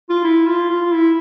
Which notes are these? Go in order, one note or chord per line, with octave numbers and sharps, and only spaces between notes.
F4
E4
F4
F4
E4